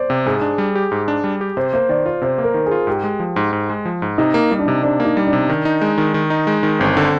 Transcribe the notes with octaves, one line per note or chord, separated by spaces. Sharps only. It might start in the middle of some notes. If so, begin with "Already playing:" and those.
Already playing: C5 D5
C3 G4
G#2 G#4
D4
G3
G4
G#2
D4
G3
G4
C3 C5
A#3 C5
D#3 D5
F4 C5
C3 C5
A#3
A#4
D#3
G#4
F4
G#2 G4
G#3
F3
G#2
G#2
G#3
F3
G#2
C3 D#4
A#3
G3 D#4
D4
C3 D#4
C3 D4
A#3
D#4
G3
D4
C3
D#3
D#4
G#3
D#3
D#3
D#4
G#3
D#3
G1 C4
D3